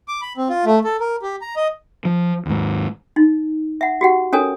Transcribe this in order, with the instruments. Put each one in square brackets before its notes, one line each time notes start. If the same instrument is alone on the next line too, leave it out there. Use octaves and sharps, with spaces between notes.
[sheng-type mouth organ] D6
B5
C4
F4
A3
A4
A#4
G4
A#5
D#5
[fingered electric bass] F3
D#2 G#2
[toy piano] D#4
E5 F#5
F#4 G4 F#5
C#4 A4 A#4 C#5 G#5 D#6